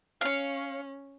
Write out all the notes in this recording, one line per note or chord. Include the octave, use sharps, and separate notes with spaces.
C#4 C#5 F5